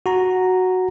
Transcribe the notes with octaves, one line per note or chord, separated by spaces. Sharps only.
F#4 A#5